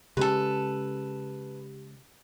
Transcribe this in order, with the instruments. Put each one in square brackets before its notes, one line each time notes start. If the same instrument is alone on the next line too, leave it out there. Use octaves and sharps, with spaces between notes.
[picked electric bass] C#3 G#3 C#4 [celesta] G4 [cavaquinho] A4 B4